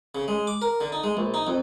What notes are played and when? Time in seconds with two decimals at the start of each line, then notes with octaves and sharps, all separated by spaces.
0.15 C#3
0.28 G#3
0.47 D6
0.62 A#4
0.81 D3
0.92 D#4
1.04 G#3
1.17 A#1
1.34 D#4
1.47 F2